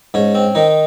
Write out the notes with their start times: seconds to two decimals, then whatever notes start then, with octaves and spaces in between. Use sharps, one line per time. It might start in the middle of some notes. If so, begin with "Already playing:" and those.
0.14 G#2 C#4
0.35 C4
0.55 D#3 D#4